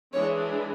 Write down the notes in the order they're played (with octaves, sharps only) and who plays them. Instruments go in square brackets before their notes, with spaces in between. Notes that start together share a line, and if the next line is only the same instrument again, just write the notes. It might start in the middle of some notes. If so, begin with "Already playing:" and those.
[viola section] E3 G#3 D4 [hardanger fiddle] C#5